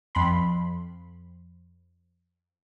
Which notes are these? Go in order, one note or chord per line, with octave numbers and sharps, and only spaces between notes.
F2 B5 C6